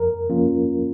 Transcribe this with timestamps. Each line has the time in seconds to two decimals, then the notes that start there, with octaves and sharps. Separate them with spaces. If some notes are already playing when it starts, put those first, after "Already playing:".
Already playing: F2 A#4
0.30 F3 A#3 C#4 F4